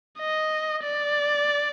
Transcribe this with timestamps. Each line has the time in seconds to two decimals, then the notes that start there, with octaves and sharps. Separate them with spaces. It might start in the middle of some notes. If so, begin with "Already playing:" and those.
0.19 D#5
0.83 D5